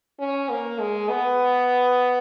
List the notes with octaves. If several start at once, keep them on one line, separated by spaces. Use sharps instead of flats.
C#4
A#3
G#3
B3